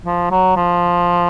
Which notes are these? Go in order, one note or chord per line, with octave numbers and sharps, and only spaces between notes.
F3
F#3
F3